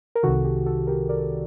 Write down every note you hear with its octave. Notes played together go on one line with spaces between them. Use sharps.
A#4
C2 C3 D#3 F#4 A4
G4
F#4 A4
G4 A#4
A#4 D5